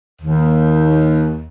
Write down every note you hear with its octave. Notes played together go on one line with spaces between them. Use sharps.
D#2